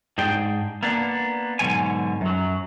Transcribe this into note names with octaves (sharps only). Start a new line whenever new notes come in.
G#2 D4 G#4 G5
A#3 B3 D4
G#2 B2 D3 F#3 C#5 G#5
F#2 F#3